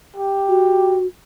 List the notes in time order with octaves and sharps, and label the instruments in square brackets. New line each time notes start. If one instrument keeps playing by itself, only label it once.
[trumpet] G4
[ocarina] F#4